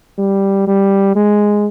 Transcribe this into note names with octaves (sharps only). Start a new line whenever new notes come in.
G3
G3
G#3